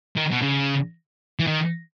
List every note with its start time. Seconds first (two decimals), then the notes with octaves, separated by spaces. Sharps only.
0.17 D#3
0.32 B2
0.42 C#3
1.39 E3
1.47 D#3